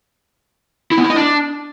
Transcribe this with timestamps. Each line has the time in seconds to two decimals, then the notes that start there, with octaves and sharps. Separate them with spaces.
0.91 E4
0.98 B3
1.04 E4
1.10 D#5
1.16 D4